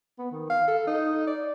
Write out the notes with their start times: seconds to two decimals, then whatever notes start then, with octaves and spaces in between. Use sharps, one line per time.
0.19 B3
0.32 D#3
0.50 F5
0.68 A4
0.87 D#4
1.27 D5